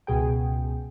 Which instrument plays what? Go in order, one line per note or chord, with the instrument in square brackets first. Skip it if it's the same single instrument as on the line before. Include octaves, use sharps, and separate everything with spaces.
[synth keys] C#2 B2 G#4 G5